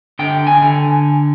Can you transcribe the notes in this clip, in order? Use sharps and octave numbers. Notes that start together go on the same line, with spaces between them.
D3 G5
G#5
D3